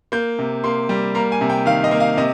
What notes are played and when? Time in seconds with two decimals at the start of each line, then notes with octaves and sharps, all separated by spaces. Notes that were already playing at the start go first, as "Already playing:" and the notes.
0.12 A#3 G6
0.39 C3
0.64 A#3 C6
0.89 G3
1.15 A#3 A#5
1.32 G#5
1.41 C3
1.50 G5
1.66 D#3 F5
1.84 D#5
1.91 A#3
2.00 F5
2.17 C3 D#5